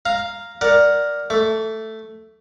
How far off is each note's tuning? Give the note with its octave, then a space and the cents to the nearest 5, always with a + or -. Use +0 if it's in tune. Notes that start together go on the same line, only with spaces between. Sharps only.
F5 +0 A#5 +0
A#4 +5 D5 +0 F#5 +0
A3 +0 D6 -45